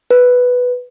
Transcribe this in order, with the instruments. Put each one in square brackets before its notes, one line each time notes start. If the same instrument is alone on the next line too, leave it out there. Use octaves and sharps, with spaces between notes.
[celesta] B4